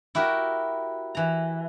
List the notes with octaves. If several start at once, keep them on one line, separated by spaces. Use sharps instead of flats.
E4 F#4 G4 A#4
E3 A#5